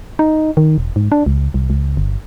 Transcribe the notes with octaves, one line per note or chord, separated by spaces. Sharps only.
D#4
D#3
E1
G#2
D4
C#2
C2
C#2
G1